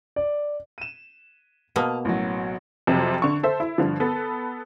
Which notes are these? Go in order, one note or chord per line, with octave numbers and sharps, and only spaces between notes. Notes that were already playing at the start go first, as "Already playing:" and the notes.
D5
D#7 E7
B2 A#3 A5 D#6 F6
A1 F#3
F2 C3 F#3
D3 C#6
A4 C5 E5
E4
G2 D3 F3
B3 A4 B4